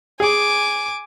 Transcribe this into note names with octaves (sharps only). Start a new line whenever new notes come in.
G#4 G#5 D6